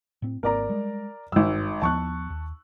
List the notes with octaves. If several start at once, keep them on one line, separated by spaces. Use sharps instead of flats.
A2 C4
G#1 A#3 C4 A#4 D5 A#5
G3 G#3
G#1 G2 E6
D#2 F3 B3 A5 C#6 F#6
D#2